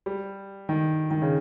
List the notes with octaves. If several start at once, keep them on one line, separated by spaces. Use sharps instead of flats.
G3
D#3
D#3
C#3